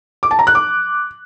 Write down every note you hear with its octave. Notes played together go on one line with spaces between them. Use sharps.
D6
A5
A#5
F#6
D6